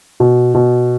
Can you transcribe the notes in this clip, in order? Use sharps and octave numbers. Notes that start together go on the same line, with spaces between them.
B2
B2